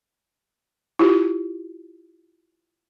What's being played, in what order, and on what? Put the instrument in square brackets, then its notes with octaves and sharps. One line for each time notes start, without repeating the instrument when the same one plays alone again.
[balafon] E4 F4 G4